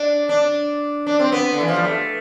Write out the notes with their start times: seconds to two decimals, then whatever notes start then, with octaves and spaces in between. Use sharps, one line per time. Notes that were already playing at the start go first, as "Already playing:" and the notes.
Already playing: D4
0.29 D4
1.07 D4
1.19 C4
1.32 B3
1.52 D3
1.60 E3
1.68 F3
1.76 G3
1.84 A3